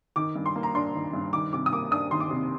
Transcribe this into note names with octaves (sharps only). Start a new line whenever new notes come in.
D#3 D6
G2
C6
A#3
A#5
D4 C6
D#3
G2
D#3 D6
C3 D6
D#6
A#3 D6
D4 D#6
D#3 C6
D6
C3